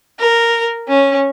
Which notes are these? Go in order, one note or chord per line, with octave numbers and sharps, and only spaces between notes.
A#4
C#4